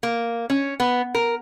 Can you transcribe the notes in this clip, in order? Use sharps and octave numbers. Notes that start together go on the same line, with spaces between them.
A#3
C#4
B3
A#4